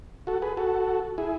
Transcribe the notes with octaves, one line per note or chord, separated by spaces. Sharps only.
F#4 A4
G#4 B4
F#4 A4
E4 G#4